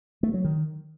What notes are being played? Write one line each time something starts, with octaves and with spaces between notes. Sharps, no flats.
A3
F#3
D#3